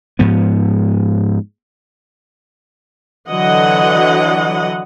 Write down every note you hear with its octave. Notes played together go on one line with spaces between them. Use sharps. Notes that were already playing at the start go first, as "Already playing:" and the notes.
G#2 F3 B3
D3 E3 F#3 D#5 F#5